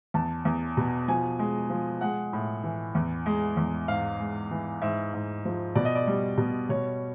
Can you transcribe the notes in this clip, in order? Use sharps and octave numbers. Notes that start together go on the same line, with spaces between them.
E2 A5
E2
B2
F3 G#5
G#3
F3
G#3 F#5
A2
E3
E2
G#3
E2
G#2 F5
G#3
E3
G#2 E5
G#2
F3
B2 D5
D#5
D5
G3
B2
B2 C#5